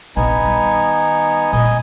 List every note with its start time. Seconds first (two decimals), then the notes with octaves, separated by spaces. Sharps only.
0.16 A#1 C3 B3 D#4 G#5
0.41 D#3 G3
1.53 A#2 G#3 D#5 G#5